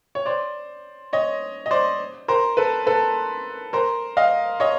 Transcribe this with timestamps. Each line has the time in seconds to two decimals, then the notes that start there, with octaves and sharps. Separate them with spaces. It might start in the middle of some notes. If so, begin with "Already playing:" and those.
0.15 C#5
0.26 C5 D5
1.13 C#5 D#5
1.66 D#5
1.71 C5 D5
2.28 A#4 C5
2.57 A4 B4
2.86 A4 B4
3.73 A#4 C5
4.17 D#5 F5
4.60 C#5 D#5